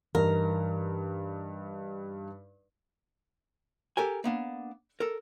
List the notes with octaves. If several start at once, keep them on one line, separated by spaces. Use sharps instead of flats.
G2 E3 D#4 A#4
G4 A4 A#4 G#5
A#3 B3 D4
A4 A#4